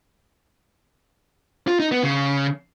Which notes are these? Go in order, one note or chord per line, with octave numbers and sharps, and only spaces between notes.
F4
D#4
B3
C#3